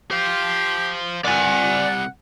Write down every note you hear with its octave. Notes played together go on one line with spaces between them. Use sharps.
G4 C5 F5
C2 D5 F#5 G#5